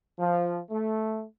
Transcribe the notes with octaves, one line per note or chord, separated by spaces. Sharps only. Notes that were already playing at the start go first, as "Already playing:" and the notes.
F3
A3